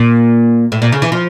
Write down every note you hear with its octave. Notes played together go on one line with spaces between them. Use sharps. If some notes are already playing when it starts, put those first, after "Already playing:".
Already playing: A#2
A2
A#2
C#3
E3
F3